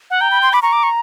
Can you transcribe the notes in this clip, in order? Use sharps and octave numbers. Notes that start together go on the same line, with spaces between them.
F#5
G5 A#5
B5
C6
B5 D6
A#5 C#6
D6
C#6